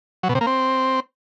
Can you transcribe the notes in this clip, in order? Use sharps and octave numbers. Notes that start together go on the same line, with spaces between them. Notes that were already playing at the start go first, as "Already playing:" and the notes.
F#3
B2
C3
A#3
C4